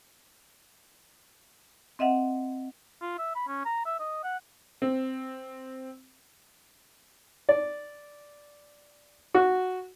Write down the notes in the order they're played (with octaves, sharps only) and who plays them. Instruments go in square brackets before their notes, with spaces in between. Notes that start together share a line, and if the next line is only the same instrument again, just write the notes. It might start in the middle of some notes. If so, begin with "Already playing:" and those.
[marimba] C4 D#5 E5 F#5
[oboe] F4
E5
B5
C#4
A#5
E5
D#5
F#5
[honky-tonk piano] C4
[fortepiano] D5
F#4